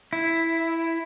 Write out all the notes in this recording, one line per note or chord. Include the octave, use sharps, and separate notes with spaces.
E4